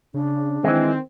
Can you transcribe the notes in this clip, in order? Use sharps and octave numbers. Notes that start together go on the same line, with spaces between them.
C#3 D4
D#3 E3 G#3 C4